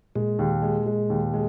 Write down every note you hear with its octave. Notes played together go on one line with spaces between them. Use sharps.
A#2 G#3
D#2
G#3
G#3
D#2
G#3